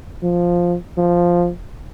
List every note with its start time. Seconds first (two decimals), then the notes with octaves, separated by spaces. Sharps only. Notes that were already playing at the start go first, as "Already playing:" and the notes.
0.23 F3
0.97 F3